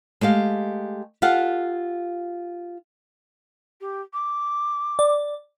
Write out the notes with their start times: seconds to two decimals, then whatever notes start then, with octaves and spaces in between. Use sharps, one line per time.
0.21 G#3 A3 G4 F5
1.22 F4 G4 A4 F5 F#5
3.81 G4
4.13 D6
4.99 D5